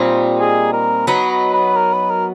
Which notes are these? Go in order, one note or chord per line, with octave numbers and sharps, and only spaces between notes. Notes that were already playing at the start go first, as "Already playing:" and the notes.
Already playing: A#2 G3 C4 D#4
G#4
A#4
F#3 B3 D#4 B4
B4
B4
A#4
B4
A#4